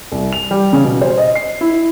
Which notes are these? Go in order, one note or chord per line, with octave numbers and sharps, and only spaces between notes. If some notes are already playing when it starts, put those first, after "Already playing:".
C2
F7
G3
C#3
B2
C5
D#5
C7
E4